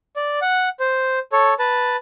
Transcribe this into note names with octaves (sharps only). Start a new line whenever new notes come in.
D5
F#5
C5
A4 C#5
B4 A5